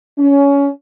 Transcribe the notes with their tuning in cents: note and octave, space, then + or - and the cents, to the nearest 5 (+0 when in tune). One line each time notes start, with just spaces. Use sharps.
C#4 +20